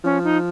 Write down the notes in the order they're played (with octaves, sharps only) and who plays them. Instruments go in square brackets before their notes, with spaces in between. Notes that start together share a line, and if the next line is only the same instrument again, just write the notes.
[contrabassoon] F3 [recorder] C#4
[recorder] D#4